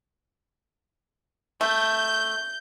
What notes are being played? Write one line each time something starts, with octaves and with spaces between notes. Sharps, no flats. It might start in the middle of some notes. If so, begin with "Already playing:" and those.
A3 G6